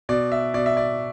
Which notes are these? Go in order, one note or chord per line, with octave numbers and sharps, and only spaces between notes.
B2 D5
E5
B2 D5
E5
D5